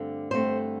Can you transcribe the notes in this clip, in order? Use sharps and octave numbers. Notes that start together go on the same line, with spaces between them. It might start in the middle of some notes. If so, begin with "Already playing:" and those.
Already playing: G2 D3 A3 C4
G2 D3 A3 C4 C5